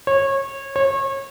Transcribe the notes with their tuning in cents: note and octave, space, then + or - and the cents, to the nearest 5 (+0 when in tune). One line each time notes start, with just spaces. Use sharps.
C#5 -25
C#5 -30